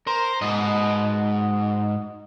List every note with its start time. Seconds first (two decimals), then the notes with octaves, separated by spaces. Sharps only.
0.07 A#4 C5
0.42 G#2 F#4 D#5